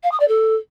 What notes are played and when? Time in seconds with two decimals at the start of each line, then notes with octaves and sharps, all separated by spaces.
0.03 F5
0.12 D#6
0.20 D5
0.28 A4